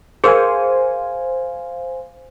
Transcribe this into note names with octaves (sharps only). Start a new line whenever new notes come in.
G#4 A#4 C5 F5 G#5